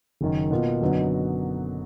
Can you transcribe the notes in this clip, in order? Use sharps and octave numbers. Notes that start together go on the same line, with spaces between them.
F#1 F#2 D#3
B2 A#3 F4
F#2 D3 F#3 B3 D#4